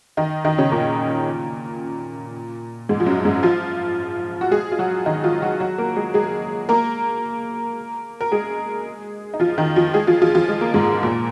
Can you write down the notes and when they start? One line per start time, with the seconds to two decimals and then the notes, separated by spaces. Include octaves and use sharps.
0.17 D#3 D#4
0.45 D#3 D#4
0.58 C#3 C#4
0.72 A#2 A#3
2.89 G#2 G#3
3.00 F3
3.06 F#2 F#3
3.25 G#2 G#3
3.43 F3 F4
4.41 F#4
4.51 G#3 G#4
4.72 F4
4.79 F#3 F#4
5.06 D#3 D#4
5.24 F3 F4
5.42 F#3 F#4
5.60 F#3 F#4
5.78 A#3 A#4
5.96 G#3 G#4
6.14 G#3 G#4
6.69 A#3 A#4
8.21 A#4
8.32 G#3 G#4
9.34 D#4
9.40 F3 F4
9.58 D#3 D#4
9.76 F3 F4
9.94 G#3 G#4
10.07 F3 F4
10.22 F3 F4
10.35 F3 F4
10.49 G#3
10.61 A#3
10.74 G#2 G#3
11.03 A#2 A#3